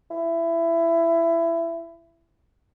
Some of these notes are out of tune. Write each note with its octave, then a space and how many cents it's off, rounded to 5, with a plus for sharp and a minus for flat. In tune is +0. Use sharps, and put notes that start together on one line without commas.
E4 +20